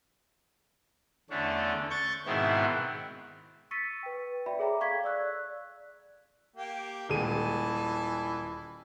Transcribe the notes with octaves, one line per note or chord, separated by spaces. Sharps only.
E2 D3 A3 C#4 D4
C#6 G6 A6
G#2 B2 D#3 B3 C4 E4
C#6 E6 A6 B6 C#7 D#7
B4 G5
F#4 D5 E5 G5 B5
G#4 A4 C#5 E5 A#5 D6
F5 C#6 G#6 B6
D5 E6 F#6
A#3 G4
D#1 E3 G#3 A5 D#7